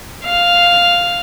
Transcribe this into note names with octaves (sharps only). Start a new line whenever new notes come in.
F5